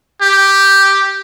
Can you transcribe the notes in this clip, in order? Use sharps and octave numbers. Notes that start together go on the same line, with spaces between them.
G4